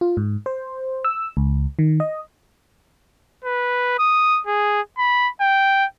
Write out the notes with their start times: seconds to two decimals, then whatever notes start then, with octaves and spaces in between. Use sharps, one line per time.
0.01 F4
0.17 G#2
0.46 C5
1.05 E6
1.37 C#2
1.79 D#3
2.00 D#5
3.44 B4
3.99 D#6
4.47 G#4
4.98 B5
5.41 G5